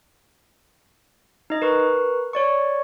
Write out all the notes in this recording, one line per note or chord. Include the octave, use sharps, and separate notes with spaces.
D#4 D#5
A#4 B4 C#6
C#5 D5 C#6